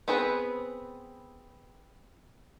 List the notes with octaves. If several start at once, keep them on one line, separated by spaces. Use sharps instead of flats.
B3 C4 G#4 B4